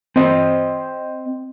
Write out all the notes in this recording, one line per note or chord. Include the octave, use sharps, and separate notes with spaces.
C4 C5 D#5